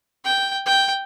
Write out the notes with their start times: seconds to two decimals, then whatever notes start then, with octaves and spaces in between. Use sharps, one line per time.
0.24 G5
0.66 G5